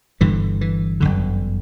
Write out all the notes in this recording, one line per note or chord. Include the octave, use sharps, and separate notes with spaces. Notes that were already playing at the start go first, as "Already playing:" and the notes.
G1 G2 D3 E3
E3
G1 F#2 D3